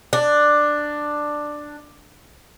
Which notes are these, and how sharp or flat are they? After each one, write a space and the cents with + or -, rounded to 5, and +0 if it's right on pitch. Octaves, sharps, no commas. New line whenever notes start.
D4 +10